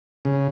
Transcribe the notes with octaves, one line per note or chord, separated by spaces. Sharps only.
C#3